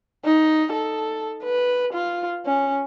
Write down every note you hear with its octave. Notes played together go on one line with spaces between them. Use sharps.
D#4
A4
B4
F4
C#4